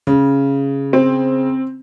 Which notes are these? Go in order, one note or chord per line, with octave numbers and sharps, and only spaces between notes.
C#3
C4